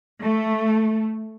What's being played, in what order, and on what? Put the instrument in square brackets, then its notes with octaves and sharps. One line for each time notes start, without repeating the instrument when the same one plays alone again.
[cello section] A3